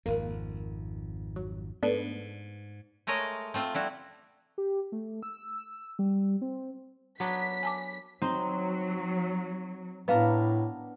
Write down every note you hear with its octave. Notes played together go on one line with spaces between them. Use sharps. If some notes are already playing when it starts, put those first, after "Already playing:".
G#1 F2 A#3
F#3
G#2 A3 B3 D4
G#3 A3 A#4 C#5 D#5
A3 C4 F4
G3 E4 F#4
G4
A3
E6
G3
C4
F#3 B3 D4 B6
G#5 A5 D6
F#3 C4 D#4 C5
A2 B3 D4 A#4 B4 F5